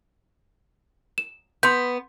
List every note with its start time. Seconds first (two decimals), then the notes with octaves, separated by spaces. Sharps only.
1.18 E7
1.63 B3 C6 G6